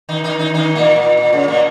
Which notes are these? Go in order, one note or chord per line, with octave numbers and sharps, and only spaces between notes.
D#3 D#4
D#3 D#4
D#3 D#4
D#3 D#4
A#2 A#3
A#2
A#2
C#3
A#2 A#3